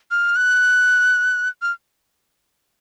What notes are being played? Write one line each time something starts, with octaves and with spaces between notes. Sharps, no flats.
F6
F#6
F6